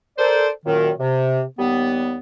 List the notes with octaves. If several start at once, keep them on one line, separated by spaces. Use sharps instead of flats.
A4 A#4 C5 D5
F#2 A#2 D#3
C3
D#2 G3 B3